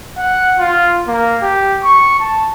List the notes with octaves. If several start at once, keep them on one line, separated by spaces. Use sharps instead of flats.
F#5
F4
A#3
G4
C#6
A5